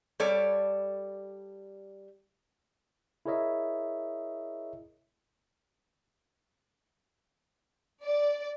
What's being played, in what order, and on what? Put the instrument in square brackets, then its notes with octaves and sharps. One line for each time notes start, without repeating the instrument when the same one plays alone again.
[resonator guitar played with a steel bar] G3 A4 C#5 D5
[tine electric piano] E4 G#4 A#4 C#5 D#5 E5
[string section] D5